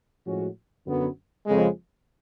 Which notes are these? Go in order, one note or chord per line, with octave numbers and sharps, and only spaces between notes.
A2 F3 G#3 C#4 F#4
F#2 D3 F#3 B3
F2 C#3 G#3